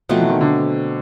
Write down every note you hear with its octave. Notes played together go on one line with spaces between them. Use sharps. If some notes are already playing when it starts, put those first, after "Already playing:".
B2 F3 F#3 A3 C4
E3
D#3
D3